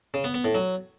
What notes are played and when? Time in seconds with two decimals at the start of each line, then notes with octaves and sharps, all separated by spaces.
0.14 C#3
0.24 B3
0.34 B3
0.44 A2
0.55 F#3